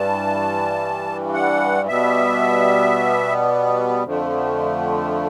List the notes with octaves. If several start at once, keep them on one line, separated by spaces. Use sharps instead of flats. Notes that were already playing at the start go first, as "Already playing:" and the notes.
Already playing: G2 E3 G3 A5
F#5
B2 G3 B3 E5
F2 D3 F3 A3